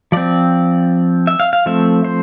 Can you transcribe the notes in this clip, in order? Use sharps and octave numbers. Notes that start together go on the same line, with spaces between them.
F3 C4 D5
E5
F5
F5
F3 A3 C4 E5
C5